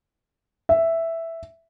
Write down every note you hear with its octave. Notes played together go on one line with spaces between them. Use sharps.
E5